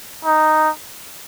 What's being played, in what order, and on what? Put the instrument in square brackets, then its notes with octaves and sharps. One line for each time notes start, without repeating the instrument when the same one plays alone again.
[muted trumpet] D#4